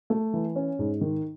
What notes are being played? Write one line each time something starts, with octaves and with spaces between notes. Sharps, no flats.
A3
E3
C#4
G#2
D#3